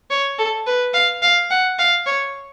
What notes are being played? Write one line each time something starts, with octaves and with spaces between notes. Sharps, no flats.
C#5
A4
B4
F5
F5
F#5
F5
C#5